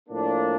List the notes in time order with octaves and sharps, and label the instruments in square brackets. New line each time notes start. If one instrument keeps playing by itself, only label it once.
[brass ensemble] A2 F3 A#3 D4